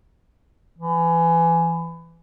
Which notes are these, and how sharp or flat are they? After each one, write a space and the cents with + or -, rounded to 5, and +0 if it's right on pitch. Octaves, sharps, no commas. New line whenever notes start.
E3 +25